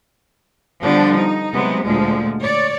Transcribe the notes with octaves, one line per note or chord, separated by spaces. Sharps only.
D3 F3 G3 B3 D4
D#4
C3 F#3 G#3 B3
D2 A#2 F3 G#3
C#5 D5